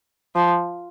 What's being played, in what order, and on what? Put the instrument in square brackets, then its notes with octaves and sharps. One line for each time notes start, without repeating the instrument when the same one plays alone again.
[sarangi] F3